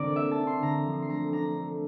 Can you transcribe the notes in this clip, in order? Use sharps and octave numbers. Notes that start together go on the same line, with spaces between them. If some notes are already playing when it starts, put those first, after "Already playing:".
Already playing: D3 C4 A#4 D5
A#3 E5
A5
D4
C6
D3 A#5
F3
C6
A3 A#5
D4 A#5
A3